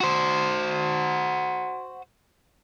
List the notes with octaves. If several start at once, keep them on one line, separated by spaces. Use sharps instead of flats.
F#4 C5